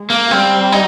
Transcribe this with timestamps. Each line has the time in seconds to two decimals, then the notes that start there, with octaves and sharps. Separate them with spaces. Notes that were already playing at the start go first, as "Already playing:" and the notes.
Already playing: G#3
0.10 A#3
0.31 G3 C4
0.72 D#4